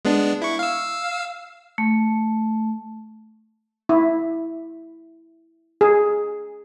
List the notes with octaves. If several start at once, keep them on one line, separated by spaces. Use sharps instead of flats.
G#3 B3 D4
E4 C#6
F5 E6
A3
E4
G#4